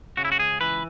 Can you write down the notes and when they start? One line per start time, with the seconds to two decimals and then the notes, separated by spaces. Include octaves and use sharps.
0.17 C#3 F#4
0.25 E4
0.32 F#4
0.39 C#2 G#4
0.61 E3 B4